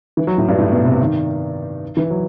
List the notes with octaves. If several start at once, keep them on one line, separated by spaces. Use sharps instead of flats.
E3
F#3
A2
G2
A2
B2
C3
D#3
E3
F#3